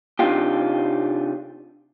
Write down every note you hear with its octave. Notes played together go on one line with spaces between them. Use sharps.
C3 C4 D4 D#4 F4 G4